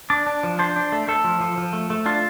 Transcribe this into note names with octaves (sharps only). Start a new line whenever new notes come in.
D4 D5
D4
F3
D4 C5
D4
A3
A3 A4
F3
F3
F3
A3
A3
D4 F4